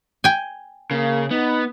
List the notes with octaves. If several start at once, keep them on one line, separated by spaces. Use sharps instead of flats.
G5 G#5
C#3 A#3
B3 D#4